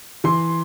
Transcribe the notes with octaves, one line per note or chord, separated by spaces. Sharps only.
E3 C6